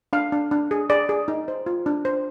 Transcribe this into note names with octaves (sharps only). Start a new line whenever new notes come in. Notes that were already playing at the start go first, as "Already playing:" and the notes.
D4 F5
D4
D4
G#4
G#4 D5
G#4
D#4
C5
F4
D4
C5